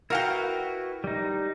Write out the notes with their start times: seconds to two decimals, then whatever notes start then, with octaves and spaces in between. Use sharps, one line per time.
0.10 E4 F#4 A#4 B4 F5 G5
1.04 G3 D#4